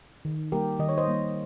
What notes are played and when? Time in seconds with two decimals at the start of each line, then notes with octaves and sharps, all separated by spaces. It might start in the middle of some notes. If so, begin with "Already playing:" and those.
0.25 D#3
0.52 G3 A#3 G4 A#4
0.79 D#3 D#5
0.89 C#5
0.98 C5 D#5
1.07 G3 A#3